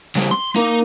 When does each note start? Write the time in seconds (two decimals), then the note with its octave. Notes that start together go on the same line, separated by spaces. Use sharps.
0.15 C#3 G3
0.31 C6
0.56 A#3 D#4